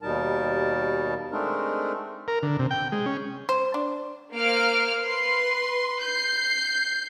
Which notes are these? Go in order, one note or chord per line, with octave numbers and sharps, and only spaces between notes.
D#2 B2 G3 D#4 A#4 A5
G#3 A3 C4 D4 D#4 A#4
A#4
D3
C3
G5
G#3
C#4
C5
D4
A#3 C5 F5 F6 D7
B4 C6
G6 C7